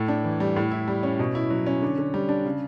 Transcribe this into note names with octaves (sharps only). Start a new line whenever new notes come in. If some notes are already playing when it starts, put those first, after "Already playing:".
Already playing: A2 A3
D4
E3
G3
A2
E4
G3
C#4
B2
E4
F#3
C#4
D3
D3
G3
D4
C#3